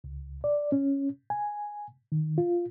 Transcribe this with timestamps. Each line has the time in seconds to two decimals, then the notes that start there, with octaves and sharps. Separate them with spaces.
0.04 C#2
0.44 D5
0.72 C#4
1.30 G#5
2.12 D#3
2.38 F4